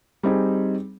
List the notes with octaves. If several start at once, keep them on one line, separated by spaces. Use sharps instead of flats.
G3 C4 D#4 G#4